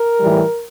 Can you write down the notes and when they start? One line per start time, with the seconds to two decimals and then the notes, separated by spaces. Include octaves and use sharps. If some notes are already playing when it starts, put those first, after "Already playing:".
Already playing: A#4
0.20 A2 E3 G3